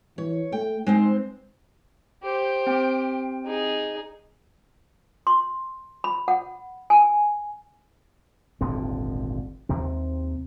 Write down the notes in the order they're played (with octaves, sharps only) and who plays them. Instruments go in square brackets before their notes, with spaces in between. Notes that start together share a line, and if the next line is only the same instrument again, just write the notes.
[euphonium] E3 [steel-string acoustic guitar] C#5
[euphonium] A3 [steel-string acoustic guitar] G5
[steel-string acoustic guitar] G#3 C4 C5 [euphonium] D#4
[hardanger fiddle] G4 C5
[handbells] C4 G5
[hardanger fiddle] D#4 G#4
[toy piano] C6
B5
F#5
G#5
[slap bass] D#1 G#1 D3 C4
D#2 C3 C4